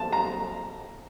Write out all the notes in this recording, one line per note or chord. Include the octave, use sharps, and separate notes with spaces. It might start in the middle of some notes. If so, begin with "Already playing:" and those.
Already playing: A5
A#5